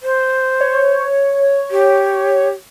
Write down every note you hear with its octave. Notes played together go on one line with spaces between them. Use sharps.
C5
C#5
G4